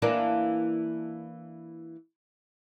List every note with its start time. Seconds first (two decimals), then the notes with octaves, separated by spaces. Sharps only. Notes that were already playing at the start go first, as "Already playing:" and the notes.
0.02 E3 A#3 D4